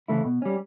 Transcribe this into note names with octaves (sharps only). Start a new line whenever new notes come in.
C#3 E3 A3 E4
B2
G3 C#4